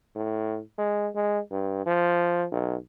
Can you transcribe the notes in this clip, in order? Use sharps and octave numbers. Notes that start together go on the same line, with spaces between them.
A2
G#3
G#3
G2
F3
B1